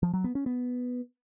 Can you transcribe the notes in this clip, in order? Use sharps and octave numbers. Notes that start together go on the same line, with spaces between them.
F3
F#3
B3
C#4
B3